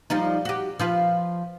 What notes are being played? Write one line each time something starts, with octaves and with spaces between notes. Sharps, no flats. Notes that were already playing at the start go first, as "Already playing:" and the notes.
F3 G3 D#4
F#4 G4
F3 F4 B4